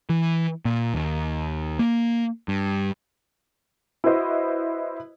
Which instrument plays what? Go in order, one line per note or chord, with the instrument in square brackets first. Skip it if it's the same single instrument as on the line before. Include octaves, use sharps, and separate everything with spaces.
[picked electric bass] E3
A#2
D#2
A#3
G2
[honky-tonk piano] E4 F#4 B4 C5 D#5